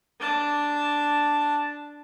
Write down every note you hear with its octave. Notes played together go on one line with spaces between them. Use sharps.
D4 A5